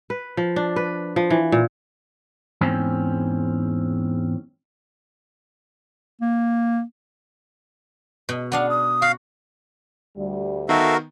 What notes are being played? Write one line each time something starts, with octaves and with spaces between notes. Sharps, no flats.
B4
F3
D4
B4
F3
E3
A#2
E2 G#2 C4 C#4
A#3
B2
B3 D4 F5 F#5
D#6
F#4 F5
D2 G3
D#3 B3 D#4 F#4 A4 A#4 E5 F5